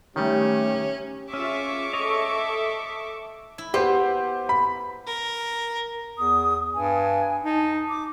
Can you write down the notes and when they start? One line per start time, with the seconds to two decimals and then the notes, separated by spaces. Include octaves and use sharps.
0.16 D#3 G3 A3 C#4 G4
1.34 C#4 F4 G#4 E5 C#6 D6
1.93 A4 C#5 D#5 E5
3.58 E4
3.74 B3 G4 C5 C6
4.49 B5
5.07 A#4
6.18 E2 D#6
6.74 G2 G#5
7.44 D#4 A5
7.89 D6